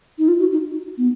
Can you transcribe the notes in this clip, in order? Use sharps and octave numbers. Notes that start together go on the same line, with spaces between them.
D#4
F4
F#4
D#4
B3